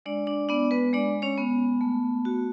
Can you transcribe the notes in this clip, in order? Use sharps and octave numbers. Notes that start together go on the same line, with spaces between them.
G#3 D4 D5
D4 D5
B3 D4 D5
B3 B4
G#3 D4 D5
C#4 C#5
B3
A3
F#4